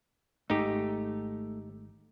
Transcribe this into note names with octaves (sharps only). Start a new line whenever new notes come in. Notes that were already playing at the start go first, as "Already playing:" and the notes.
G#1 G#2 A3 D#4 G4